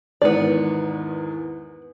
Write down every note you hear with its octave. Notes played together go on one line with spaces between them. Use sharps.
E2 G#2 D#3 B3 D5